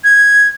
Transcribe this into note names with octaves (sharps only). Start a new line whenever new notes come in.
G#6